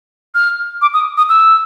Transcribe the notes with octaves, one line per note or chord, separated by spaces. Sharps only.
F6
D6
D#6
D#6
E6